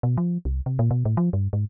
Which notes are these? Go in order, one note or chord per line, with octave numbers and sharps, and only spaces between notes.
B2
F3
C2
C3
A#2
B2
A2
F3
G2
G#2